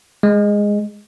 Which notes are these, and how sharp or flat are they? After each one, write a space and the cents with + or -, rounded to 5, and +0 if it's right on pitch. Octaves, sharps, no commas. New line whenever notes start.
G#3 -10